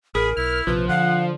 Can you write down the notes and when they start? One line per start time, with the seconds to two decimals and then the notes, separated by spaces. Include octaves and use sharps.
0.15 A1 G#4 A#4 B5
0.37 B1 E4 F6
0.67 A#1 C3 F3 B4
0.89 D3 F5 F#5